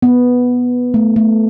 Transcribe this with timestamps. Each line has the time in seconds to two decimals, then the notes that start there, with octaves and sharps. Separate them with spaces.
0.02 B3
0.94 A3
1.16 A3